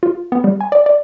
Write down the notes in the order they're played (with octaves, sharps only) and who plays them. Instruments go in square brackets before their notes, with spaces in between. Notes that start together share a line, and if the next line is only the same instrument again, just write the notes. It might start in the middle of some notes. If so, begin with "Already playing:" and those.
[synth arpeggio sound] F4
B3
G3
G#5
D5
D5